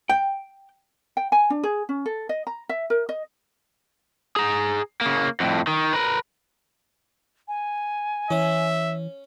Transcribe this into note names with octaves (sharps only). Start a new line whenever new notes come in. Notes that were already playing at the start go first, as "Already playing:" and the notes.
G5
G5
G#5
D4
G#4
C#4
A4
D#5
A#5
E5
A#4
D#5
G#4 A#5
C#3 A#3
F2 A2
D#3
A#4 B4
G#5
E3 C#4 E5